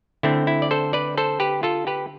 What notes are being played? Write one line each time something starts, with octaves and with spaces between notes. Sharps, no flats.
D3 A3 C4 E4
E4
D5
A4 C5
B4 D5
A4 C5
G4 B4
F4 A4
G4 B4